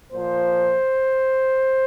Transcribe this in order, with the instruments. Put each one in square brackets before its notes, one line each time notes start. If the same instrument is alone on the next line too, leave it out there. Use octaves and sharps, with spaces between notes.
[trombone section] A#2 F3 C5